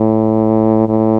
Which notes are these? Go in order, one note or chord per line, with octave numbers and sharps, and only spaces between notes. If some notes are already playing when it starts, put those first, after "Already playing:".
Already playing: A2
A2